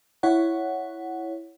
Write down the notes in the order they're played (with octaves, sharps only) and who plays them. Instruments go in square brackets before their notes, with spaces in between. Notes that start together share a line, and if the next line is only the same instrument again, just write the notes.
[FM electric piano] E4 C#5 F#5